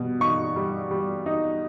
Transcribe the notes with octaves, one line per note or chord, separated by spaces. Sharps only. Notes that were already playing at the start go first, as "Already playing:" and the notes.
Already playing: B2 G3
D#4 C#6
G3
G3
D#4